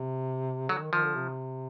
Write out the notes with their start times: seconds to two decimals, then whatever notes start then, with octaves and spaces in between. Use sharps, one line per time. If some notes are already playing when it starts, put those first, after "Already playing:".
Already playing: C3
0.69 D3 F#3
0.81 D#3
0.92 D#3 F3
1.04 D3
1.15 C3